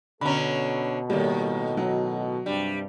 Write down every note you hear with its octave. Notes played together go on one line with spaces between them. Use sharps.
B2 D3 C#4 A4 A#5 B5
A2 D#3 G3 A#3
F#3
G2 C3 G3 D4